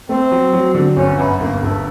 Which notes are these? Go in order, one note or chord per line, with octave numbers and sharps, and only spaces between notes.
A3 C4
F#3
F#3
D3
G1 C#4
F#2 B3
G1 A#3
G1 A3